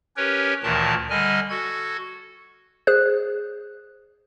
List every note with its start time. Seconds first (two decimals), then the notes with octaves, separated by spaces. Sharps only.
0.17 C#4 G4 A#4 B4 C#5
0.63 D2 A#2 D#3 E3 A#4 A5
1.10 D3 G3 D#5 G#5 F6
1.50 F#4 A4 G#6
2.87 G#4 C5 F#6